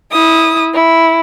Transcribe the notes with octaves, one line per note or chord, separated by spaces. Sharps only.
E4 D#6
E4